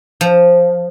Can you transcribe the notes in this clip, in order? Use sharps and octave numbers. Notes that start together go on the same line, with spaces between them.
F3